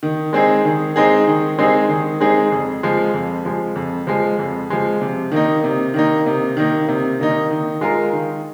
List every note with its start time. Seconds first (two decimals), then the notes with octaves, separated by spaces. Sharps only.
0.03 D#3
0.33 G#3 C4 D#4 G#4
0.65 D#3
0.96 G#3 C4 D#4 G#4
1.27 D#3
1.59 G#3 C4 D#4 G#4
1.89 D#3
2.20 G#3 C4 D#4 G#4
2.52 F2
2.83 F3 G#3
3.14 F2
3.45 F3 G#3
3.76 F2
4.07 F3 G#3
4.39 F2
4.70 F3 G#3
5.01 C3
5.32 D#3 A#3 D#4
5.64 C3
5.94 D#3 A#3 D#4
6.26 C3
6.57 D#3 A#3 D#4
6.88 C3
7.20 D#3 A#3 D#4
7.51 D#3
7.81 G#3 F4 A#4
8.13 D#3